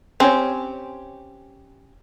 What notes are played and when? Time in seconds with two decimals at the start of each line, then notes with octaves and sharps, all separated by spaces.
0.20 C4 C#4 G4 C#5